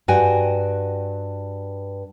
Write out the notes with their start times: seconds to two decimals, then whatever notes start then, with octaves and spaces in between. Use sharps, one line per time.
0.08 G2 F#4 G5 G#5